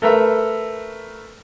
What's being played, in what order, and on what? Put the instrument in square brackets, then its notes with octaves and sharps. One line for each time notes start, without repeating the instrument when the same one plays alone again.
[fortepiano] A3 A#4 B4 E5